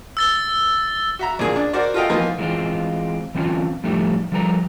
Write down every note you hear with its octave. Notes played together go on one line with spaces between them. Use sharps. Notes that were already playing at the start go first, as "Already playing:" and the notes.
E6 A6 G7
F#4 E5 A#5
A#1 A#2 G#4
D4
F#4 A#4 C5 D5
F4 F#4 A4 D#5 F5 G5
E3 F3 A#3 B3 D#4 F4
E3 G#3 B3 C4 F4
E3 C4 C#4 D#4 F4
A2 F3 G3 A3 D#4 G4
F3 G3 A4 B4 A#5